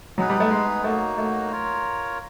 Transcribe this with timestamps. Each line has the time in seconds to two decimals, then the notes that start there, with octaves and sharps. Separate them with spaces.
0.18 F#3 B3 D#4 G#4 B4
0.30 G3
0.40 A3
0.51 G#3
0.84 F#3 A3 A#3 D#4 F#4
1.18 A3
1.51 F4 A#4 C#5